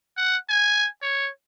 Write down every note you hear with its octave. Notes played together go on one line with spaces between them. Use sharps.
F#5
G#5
C#5